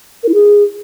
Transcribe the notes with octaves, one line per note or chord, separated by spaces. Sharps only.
A#4
E4
G#4